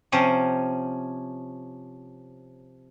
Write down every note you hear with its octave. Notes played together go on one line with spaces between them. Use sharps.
C3 F3 C#4